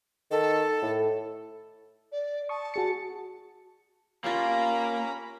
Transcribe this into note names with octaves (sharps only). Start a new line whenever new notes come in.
D#3 A4
A2
D5
A5 C#6 D#6
F#4 G#4 C#7
A#3 C#4 F4 G4 F5 A#5 B5